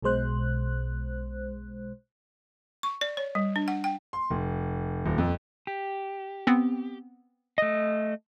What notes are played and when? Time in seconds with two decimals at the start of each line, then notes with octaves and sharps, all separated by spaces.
0.02 B1 B2 G#3 C5 F#6
2.83 C#6
3.01 D5
3.17 C#5
3.35 G3
3.56 D4
3.68 F#5
3.84 G5
4.13 C6
4.31 F1
5.06 D#1
5.18 F2
5.67 G4
6.47 B3 C4
7.58 A3 D#5